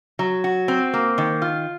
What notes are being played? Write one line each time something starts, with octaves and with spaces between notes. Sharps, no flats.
F#3
F#4
C4
A#3
D#3
F4